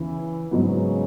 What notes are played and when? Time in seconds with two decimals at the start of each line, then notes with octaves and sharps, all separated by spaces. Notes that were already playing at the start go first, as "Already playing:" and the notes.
Already playing: E2 C#3 E3 E4
0.51 G#2 C#3 F#3 B3